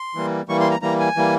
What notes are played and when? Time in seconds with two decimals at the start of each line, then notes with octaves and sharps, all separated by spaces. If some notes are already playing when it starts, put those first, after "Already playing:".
Already playing: C6
0.15 E3 G3 A#3
0.49 E3 G3 A#3 C#6
0.60 C6
0.71 A#5
0.82 E3 G3 A#3 A#5
1.00 G#5
1.16 E3 G3 A#3